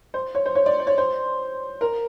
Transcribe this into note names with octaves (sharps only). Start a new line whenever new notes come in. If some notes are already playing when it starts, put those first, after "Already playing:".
C5
C#5
C5
C#5
D5
C5
C#5
C5
A#4